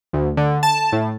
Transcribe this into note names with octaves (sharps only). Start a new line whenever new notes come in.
D2
D3
A5
A2